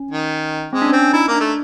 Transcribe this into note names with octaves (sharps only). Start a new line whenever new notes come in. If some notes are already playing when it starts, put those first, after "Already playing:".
Already playing: C#4
D#3
G#3 C4
D4
C#4
C4
D#4 E4
A#3
D4
A3